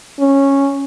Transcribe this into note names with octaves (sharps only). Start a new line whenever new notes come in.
C#4